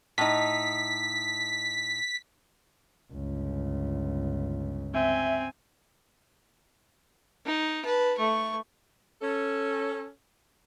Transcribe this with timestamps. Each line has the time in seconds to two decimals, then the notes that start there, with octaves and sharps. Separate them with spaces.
0.18 A2 D#4 B6
3.13 G1 C#2
4.94 C4 E5 G#5
7.45 D#4
7.85 B4 A5
8.17 A3 C#6
9.22 C#4 A4